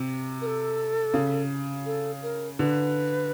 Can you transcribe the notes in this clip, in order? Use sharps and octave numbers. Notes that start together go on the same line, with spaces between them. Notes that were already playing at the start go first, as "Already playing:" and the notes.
Already playing: C3
A#4
A4
C#3
A4
A#4
D3 B4